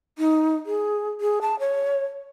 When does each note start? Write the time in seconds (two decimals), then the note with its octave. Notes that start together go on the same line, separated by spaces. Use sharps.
0.18 D#4
0.66 G#4
1.21 G#4
1.42 A5
1.59 C#5